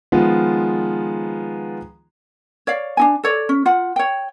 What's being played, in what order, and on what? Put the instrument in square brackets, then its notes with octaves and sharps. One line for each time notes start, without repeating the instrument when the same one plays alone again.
[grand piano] D#3 F3 G#3 B3 F4
[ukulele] C#5 D5 F5
D4 D#4 G#5
A4 C#5 D5
C#4
F4 F#5
C#5 G5